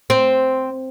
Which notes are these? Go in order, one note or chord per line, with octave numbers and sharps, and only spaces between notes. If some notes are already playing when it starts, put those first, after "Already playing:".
C4